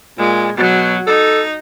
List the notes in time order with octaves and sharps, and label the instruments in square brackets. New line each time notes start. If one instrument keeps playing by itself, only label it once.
[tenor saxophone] A#2 [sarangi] G#3
[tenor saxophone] B2 [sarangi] F#3
[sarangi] D#4 [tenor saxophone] A4